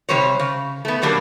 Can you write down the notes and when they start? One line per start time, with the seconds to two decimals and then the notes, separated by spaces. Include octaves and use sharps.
0.09 C3 G3 C5 C#5
0.40 C#3
0.85 A3 B3
1.02 B2 F#3 G3 A#3 D4